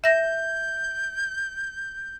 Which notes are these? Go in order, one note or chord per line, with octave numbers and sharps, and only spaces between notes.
E5 G6 A#6